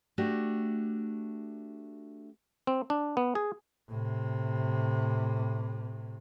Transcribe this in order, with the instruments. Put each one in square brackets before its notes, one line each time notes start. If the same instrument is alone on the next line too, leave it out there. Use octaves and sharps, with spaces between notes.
[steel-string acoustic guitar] A3 D4 F#4 G4
[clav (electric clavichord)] C4
D4
B3
G#4
[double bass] A2 C3